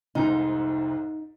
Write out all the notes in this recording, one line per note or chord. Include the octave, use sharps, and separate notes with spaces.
F1 C2 G#2 D#4